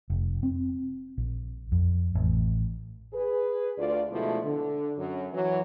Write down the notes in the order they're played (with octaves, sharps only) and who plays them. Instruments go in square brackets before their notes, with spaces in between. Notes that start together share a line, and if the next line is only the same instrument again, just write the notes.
[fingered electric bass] F1
C4
A#1
F2
A1
[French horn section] G#4 B4
D2 F4 D5
B2 D3 F3 G#3 A3 E4
D3
F#2
E3 F#3